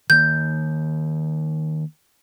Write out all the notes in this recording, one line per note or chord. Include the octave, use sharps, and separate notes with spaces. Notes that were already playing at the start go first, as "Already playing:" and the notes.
D#3 A#3 G6